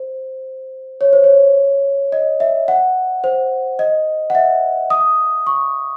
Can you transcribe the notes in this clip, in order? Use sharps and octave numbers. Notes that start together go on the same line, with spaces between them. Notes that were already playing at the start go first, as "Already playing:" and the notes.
Already playing: C5
C#5
C5
C#5
D#5
E5
F#5
C5
D#5
F#5
E5
D#6
C#6